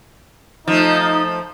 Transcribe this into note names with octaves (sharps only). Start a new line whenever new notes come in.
F3 A3 D#4